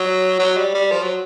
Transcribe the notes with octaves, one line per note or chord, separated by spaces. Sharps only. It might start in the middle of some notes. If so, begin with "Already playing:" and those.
Already playing: F#3
F#3
G3
G3
F3
F#3